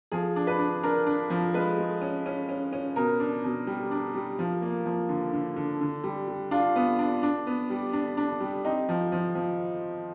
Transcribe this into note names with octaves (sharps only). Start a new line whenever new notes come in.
F3 G#4
D4
B4
D4
D4 A#4
D4
F3
G#3 B4
G#3
C#4
C#4
C#4
C#4
B2 A#4
D4
B2
G3
D4
G3
F3
A#3
F3
D3
D3
D3
D3
G3
G3
D4 F4
B3
D4
D4
B3
G3
D4
D4
G3
C4 D#4
F3
F3
F3